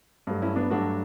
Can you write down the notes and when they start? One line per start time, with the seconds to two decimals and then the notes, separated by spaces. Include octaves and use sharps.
0.27 G2 F#3 A3
0.42 C#4 E4
0.56 B3 D4
0.70 G2 F#3 A3 D4 F#4